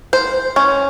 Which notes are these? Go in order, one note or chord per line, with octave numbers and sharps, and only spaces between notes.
C5
C#4